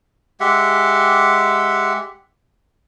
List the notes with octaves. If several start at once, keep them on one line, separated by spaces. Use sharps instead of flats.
G#3 G4 E5 F#5